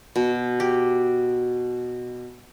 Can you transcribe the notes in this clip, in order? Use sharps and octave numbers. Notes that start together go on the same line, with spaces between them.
B2
G4